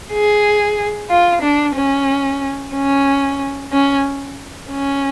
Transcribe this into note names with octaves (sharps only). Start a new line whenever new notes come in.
G#4
F4
D4
C#4
C#4
C#4
C#4